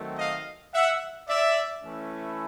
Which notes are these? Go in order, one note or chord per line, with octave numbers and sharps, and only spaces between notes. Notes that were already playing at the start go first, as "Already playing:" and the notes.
Already playing: D#3 F#3 A3 C4
D#5 F5
E5 F#5
D5 E5
E3 A3 C#4 E4